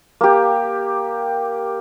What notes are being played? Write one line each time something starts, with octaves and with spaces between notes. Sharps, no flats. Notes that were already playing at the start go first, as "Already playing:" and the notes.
A#3 G4